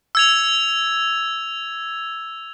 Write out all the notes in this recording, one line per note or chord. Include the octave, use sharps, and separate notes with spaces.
E6 G#6 F7